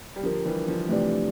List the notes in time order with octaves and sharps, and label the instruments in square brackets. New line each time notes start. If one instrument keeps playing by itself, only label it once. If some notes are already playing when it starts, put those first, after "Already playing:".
[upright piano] G3
[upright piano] D3 F3 [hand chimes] D4 G4 A#4
[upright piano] E3 G3
D3 F3
[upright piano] C3 E3 [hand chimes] A3 D4 G4 D5